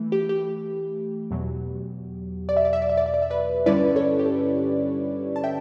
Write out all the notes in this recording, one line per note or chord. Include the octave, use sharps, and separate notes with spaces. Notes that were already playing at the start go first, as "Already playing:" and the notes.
Already playing: E3 A3
G4
G4
E2 B2 F#3
D5
E5
D5
E5
D5
E5
D5
E5
D5
E5
B4 D5
G2 D3 G3 C#4 E4 B4 D5
A4 C#5
G4
A4
A5
E5 G5